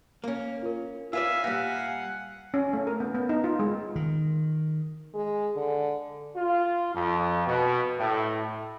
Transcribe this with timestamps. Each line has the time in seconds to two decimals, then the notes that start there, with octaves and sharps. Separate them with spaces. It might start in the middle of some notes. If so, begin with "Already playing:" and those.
0.24 A#3 C#4
0.63 F4 A#4
1.13 F4 B4 D5 E5 F5 G#5 E6
1.44 A#2 G3 F#5 A#6 B6
2.54 C#4
2.73 A3
2.87 A#4
3.00 B3
3.15 B3
3.29 D#4
3.44 F4
3.59 G#3
3.96 D#3
5.14 G#3
5.57 D3
6.35 F4
6.95 F2
7.47 B2
7.98 A2